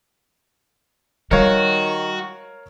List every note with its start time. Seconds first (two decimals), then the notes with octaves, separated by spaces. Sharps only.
1.31 D#3 G3 F#4 A#4 C#5 F5